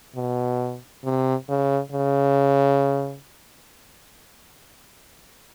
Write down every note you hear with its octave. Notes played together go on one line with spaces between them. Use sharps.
B2
C3
C#3
C#3